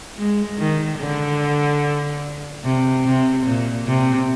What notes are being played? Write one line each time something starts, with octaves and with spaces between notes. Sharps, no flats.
G#3
D#3
D3
C3
C3
A#2
C3